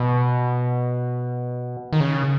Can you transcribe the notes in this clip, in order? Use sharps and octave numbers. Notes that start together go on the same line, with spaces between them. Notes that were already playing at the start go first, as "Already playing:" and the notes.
Already playing: B2
D#3
C#3